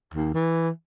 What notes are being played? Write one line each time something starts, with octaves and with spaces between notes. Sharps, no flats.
D#2
E3